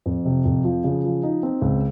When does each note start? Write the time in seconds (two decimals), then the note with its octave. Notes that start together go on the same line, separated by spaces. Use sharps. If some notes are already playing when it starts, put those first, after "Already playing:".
0.06 F2
0.25 C3
0.45 F2
0.64 F3
0.84 C#3
1.04 F3
1.23 D#4
1.43 C4
1.62 C#2